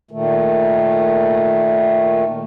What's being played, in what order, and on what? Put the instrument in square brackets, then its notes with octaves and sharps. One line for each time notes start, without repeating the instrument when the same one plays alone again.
[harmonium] A#2 D#3 A3